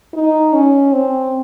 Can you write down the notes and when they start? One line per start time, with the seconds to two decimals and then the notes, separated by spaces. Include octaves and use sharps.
0.14 D#4
0.53 C#4
0.92 C4